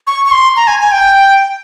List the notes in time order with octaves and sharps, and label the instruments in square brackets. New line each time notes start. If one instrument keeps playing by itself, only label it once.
[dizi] C#6
C#6
C6
A#5
G#5
G#5
G5